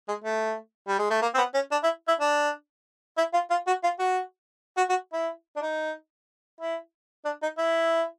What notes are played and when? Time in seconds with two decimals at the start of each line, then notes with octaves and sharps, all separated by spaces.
0.08 G#3
0.24 A3
0.88 G3
0.99 G#3
1.10 A3
1.22 A#3
1.35 C4
1.38 B3
1.54 C#4
1.72 D4
1.84 E4
2.08 E4
2.20 D4
3.18 E4
3.34 F4
3.50 F4
3.67 F#4
3.83 F4
3.99 F#4
4.77 F#4
4.90 F#4
5.13 E4
5.56 D4
5.62 D#4
6.61 E4
7.25 D4
7.43 D#4
7.58 E4